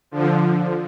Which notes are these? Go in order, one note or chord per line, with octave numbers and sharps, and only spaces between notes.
D3 F3